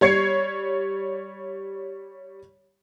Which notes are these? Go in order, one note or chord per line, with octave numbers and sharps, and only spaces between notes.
G3 C#5 G#6 C7 C#7